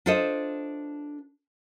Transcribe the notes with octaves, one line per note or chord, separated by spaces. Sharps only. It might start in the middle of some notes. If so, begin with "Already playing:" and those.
D4 F4 A4 C5 D#5